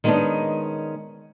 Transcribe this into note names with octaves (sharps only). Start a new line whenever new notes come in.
D#3 G#3 A3 B3 C#4 D4